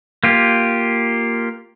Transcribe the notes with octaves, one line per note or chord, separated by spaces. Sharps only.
A#3 F4 G4